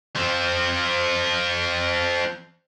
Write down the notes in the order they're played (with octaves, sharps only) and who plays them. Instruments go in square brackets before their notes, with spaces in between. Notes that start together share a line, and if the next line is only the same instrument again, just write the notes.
[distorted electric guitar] F3 C4